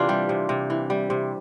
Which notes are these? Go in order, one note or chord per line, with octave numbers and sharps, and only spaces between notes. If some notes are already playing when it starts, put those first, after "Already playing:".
Already playing: C3 E3 D4 F4 G4
G3
C3
C3
E3
G3
C3